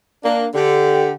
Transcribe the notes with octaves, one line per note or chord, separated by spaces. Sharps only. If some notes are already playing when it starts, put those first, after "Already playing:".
A#3 D4
D3 G4